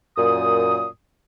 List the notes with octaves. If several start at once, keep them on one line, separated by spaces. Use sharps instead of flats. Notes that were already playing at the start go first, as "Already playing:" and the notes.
F#2 A#2 D#6